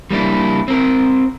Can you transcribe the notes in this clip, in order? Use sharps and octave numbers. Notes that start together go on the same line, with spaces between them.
G3 A#3 D4 E4
C4 A#4